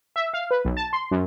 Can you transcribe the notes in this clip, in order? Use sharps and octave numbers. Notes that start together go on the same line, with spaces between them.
E5
F5
B4
B1
A5
C6
F#2